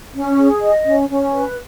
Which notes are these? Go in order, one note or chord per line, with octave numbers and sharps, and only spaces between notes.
C#4
G#4
D#5
C#4
C#4
B4